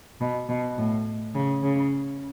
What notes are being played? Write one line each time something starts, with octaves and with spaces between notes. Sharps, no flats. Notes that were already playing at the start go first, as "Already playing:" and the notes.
B2
B2
A2
C#3
C#3